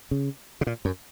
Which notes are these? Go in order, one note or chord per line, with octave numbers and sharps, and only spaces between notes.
C#3
C#3
A#2
F#2